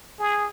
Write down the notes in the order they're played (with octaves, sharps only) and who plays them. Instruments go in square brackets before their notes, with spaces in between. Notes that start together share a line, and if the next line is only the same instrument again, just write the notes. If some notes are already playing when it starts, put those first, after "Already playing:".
[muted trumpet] G#4